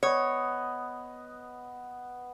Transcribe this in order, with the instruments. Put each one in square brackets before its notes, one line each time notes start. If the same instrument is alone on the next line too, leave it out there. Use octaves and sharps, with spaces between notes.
[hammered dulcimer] B3 D#5 [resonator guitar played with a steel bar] C#5